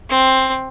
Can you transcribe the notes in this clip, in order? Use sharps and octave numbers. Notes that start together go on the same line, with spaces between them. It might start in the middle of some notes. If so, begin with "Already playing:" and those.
C4